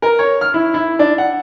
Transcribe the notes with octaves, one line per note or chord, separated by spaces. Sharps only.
A#4
C#5
F6
E4
E4
D4
F#5